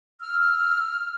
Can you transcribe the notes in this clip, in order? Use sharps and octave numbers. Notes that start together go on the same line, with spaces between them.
E6 F6